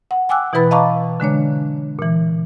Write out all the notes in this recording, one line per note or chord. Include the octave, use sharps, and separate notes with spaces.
F#5
G5 G#5 D6 E6 F#6
B2 E3 E4 B4 B5 A6
D#5 F5 A5 A#5 C#6 D6
D3 G#3 D4 C#5
A#2 E3